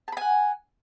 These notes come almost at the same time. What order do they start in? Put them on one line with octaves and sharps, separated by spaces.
A5 B5 G#5 F#5